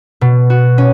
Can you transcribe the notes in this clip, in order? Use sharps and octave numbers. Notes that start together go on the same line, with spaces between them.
B2
F#4
C#4